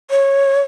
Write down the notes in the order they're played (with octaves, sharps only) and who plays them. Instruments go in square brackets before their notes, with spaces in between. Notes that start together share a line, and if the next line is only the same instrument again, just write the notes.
[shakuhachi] C#5